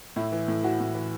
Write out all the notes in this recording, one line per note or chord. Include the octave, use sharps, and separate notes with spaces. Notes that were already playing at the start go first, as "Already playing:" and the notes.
A2 E4
E3
A2
E3 F#4
A2
E3